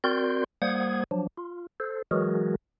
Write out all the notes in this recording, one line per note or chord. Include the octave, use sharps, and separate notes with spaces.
C4 F#4 A#4 D5 C6 G6
G3 A#3 C5 F#5 D#6 G#6
F3 F#3 D4
F4
A4 C5
E3 F#3 G#3 F#4 G#4 A#4